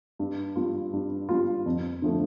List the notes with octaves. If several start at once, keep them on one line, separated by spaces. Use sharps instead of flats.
G2
G3 F4
G2
G3 F4
F2
D3 F3 A3